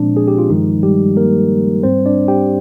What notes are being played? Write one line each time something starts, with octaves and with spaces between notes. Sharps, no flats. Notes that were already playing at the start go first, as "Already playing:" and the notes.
Already playing: A#2 F3 G#3 C4 D4
G#4
G4
F4
G2 D#3 F3 G#3 D#4
G3 G4
A#3 A#4
G#2 G3 C4 C5
D4 D5
G4 G5